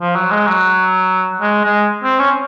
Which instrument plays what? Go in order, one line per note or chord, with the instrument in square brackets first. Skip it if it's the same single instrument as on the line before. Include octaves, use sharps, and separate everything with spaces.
[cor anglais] F3
F#3
G#3
F#3
G#3
G#3
C4
C#4